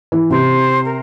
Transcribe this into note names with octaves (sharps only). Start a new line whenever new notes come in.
E3
C3 C5
A#4